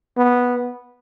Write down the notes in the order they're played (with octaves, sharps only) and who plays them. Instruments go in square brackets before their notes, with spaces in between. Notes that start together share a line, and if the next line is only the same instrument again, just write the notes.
[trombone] B3